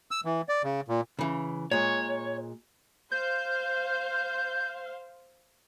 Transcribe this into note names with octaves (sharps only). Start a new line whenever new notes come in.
E6
E3
D5
C#3
A#2
C#3 E3
A#2 G#3 C#5
C5 F5 G6